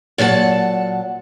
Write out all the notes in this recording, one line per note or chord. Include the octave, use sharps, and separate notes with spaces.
A#2 F#3 F#5 A5